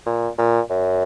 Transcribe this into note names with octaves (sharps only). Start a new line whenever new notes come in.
A#2
A#2
F#2